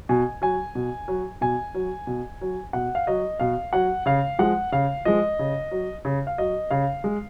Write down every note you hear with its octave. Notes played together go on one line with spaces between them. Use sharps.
B2 G#5
F#3 G#5
B2
F#3
B2 G#5
F#3
B2
F#3
B2 F#5
F5
F#3 D#5
B2 F5
F#3 F#5
C#3 F5
F3 G#3 F#5
C#3 F5
F3 G#3 D#5
C#3
F#3
C#3
F5
F#3 D#5
C#3 F5
G#3